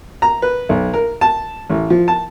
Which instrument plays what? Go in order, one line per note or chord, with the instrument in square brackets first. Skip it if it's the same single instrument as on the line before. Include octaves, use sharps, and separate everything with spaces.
[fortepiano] A#5
B4
B1
A#4
A5
A1
F3
A5